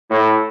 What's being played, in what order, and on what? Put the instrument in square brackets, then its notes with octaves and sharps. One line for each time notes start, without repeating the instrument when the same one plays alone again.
[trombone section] A2